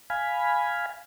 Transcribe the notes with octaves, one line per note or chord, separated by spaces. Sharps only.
F5 G#5 B5